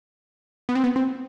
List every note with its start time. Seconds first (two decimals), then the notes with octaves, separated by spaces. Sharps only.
0.69 B3
0.75 C4
0.84 B3
0.96 C4